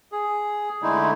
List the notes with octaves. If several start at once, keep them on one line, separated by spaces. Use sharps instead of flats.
G#4
D3 G#3 A3 D#4 E4